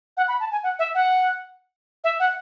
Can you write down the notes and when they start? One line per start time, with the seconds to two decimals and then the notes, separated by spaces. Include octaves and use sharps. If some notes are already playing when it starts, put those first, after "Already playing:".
0.17 F#5
0.28 B5
0.40 A5
0.51 G#5
0.63 F#5
0.79 E5
0.95 F#5
2.04 E5
2.20 F#5